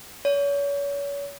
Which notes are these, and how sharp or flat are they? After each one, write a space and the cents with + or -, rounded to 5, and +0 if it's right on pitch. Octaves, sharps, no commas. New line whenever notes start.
C#5 +35